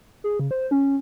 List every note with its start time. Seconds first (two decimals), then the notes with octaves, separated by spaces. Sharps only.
0.24 G#4
0.40 C#3
0.51 C5
0.71 C#4